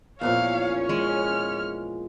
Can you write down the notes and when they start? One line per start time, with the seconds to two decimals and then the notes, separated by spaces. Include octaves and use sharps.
0.21 E2 A#2 F3 C#4 C#5 F5
0.89 G#3 F6